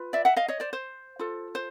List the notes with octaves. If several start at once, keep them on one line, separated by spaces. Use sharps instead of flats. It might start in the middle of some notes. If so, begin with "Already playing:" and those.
Already playing: F4 B4
D5 E5
E5 F#5
D#5 F5
C#5 D#5
C5 D5
C5
F4 A4
C5